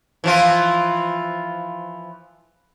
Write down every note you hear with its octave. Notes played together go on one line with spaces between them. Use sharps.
E3 F3 F4